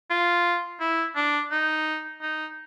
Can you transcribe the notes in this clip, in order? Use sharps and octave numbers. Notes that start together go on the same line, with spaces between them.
F4
E4
D4
D#4
D#4